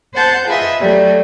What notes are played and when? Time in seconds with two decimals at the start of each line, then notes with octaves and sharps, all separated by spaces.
0.15 C5 F#5 A5 G6
0.47 F4 G#4 B4 D#5 E5
0.81 F#3 G3 A3